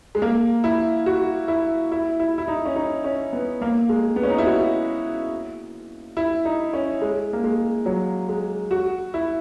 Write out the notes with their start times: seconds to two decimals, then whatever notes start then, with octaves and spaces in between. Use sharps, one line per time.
0.15 G#3
0.22 A#3
0.64 E4
1.06 F#4
1.48 E4
1.92 E4
2.20 E4
2.38 E4
2.48 D#4
2.65 C#4
2.76 D#4
3.04 C#4
3.33 B3
3.62 A#3
3.89 G#3
4.16 B3
4.23 C#4
4.30 D#4
4.38 E4
4.46 F#4
6.17 E4
6.45 D#4
6.73 C#4
7.02 G#3
7.33 A#3
7.44 G#3
7.86 F#3
8.29 G#3
8.71 F#4
9.14 E4